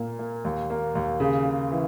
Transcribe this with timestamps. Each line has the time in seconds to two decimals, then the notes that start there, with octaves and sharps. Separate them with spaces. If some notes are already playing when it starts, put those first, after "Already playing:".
Already playing: A#2 A#3
0.19 A#3
0.45 D#2
0.70 A#3
0.95 D#2
1.20 C#3
1.45 C#3
1.72 E3